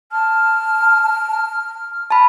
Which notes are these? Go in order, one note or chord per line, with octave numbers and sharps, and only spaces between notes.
A5 F6
A5 B5